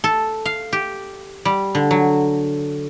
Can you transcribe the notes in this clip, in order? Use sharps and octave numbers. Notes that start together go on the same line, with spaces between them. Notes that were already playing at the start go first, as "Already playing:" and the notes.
A4
F5
G4
G3
D3
F#3